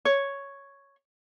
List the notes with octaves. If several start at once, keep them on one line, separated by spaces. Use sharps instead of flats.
C#5